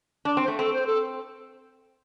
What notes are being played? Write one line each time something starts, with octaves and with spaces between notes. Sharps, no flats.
D4 D5
C4
C5
A3
C4 A4
C5
A4